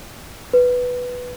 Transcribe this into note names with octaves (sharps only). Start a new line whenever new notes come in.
B4